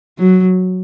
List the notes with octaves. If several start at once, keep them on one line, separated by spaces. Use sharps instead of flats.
F#3